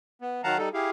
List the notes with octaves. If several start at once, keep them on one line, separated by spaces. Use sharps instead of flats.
B3
D#3 F#3 F5 F#5 A5 A#5
G3 D#4 A4
E4 G4 G#4 F5